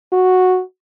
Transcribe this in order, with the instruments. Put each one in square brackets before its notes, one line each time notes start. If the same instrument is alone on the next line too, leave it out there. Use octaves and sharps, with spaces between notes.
[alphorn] F#4